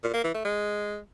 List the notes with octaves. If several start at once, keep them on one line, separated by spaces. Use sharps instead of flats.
A#2
A#3
E3
A3
G#3